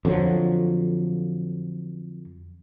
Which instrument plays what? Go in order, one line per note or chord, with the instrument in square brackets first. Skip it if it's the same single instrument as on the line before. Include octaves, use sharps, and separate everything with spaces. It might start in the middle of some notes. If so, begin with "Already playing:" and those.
[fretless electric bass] F2 D3 F3 F#3